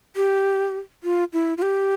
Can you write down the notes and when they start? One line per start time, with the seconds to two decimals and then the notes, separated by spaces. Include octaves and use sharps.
0.16 G4
1.03 F4
1.33 E4
1.57 F4
1.62 G4